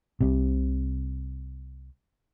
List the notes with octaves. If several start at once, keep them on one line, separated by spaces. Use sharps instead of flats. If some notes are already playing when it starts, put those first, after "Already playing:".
C2 C3